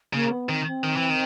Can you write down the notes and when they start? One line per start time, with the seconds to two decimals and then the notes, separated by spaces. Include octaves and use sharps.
0.13 C#3 A#3
0.31 B3
0.49 D#3 C4
0.67 C4
0.84 D#3
0.97 E3
1.10 D#3